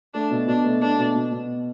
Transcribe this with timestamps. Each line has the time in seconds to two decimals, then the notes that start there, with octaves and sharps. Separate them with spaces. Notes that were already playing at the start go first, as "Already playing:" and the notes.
0.14 A3 D4
0.31 B2
0.47 B2 D4
0.64 A3
0.82 A3 D4
0.99 B2
1.15 B2
1.32 B2